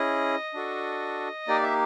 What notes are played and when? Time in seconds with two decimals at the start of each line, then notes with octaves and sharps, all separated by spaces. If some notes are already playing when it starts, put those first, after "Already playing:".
Already playing: C#4 E4 G#4 D#5
0.54 D4 F#4 A4
1.48 A#3 D#4 G4 D5
1.63 E5